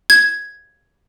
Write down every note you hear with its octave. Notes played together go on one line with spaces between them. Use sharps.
G#6